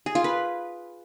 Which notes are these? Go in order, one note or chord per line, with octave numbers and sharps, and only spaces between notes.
G#4
F4
B4